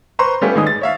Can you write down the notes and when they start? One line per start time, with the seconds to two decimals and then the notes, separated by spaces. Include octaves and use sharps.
0.19 B4 C5 A#5 C6 C#6
0.41 G3 A3 B3 C#4 F4 G4
0.55 G#1 G#3 D#4 D#6
0.67 A6
0.81 C#5 E5 F5